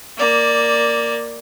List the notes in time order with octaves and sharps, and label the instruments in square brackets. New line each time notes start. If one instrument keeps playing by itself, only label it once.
[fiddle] A#3 D5